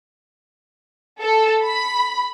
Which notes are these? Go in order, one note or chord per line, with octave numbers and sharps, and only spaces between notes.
A4
B5